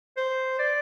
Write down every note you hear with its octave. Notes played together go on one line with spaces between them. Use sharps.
C5
D5